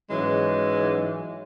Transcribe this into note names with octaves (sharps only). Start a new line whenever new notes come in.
G#2 E3 F#3 G#3 C#4